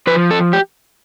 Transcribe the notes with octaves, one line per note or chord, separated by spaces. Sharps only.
F3 B4
A4
G4